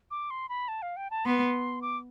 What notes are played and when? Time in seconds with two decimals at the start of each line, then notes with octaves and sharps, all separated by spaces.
0.11 D6
0.30 C6
0.49 B5
0.68 A5
0.82 F5
0.96 G5
1.10 A5
1.25 B3 C6
1.82 D6